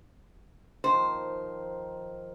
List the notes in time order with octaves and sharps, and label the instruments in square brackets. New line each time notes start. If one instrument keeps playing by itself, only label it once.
[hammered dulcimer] D#3 F3 [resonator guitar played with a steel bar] C5